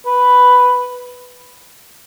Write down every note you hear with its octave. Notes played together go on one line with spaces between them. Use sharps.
B4